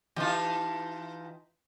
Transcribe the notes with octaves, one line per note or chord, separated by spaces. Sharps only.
E3 D#4 F4 G4 A5